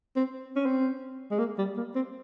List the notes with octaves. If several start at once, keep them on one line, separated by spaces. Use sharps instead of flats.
C4
C#4
C4
G#3
A#3
G3
A#3
C4